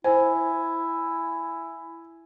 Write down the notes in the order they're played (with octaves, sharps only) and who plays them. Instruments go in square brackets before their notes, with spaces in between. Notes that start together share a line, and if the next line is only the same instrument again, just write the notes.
[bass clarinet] E4 [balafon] C5 [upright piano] G#5